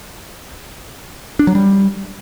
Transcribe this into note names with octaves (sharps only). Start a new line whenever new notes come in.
D4
F#3
G3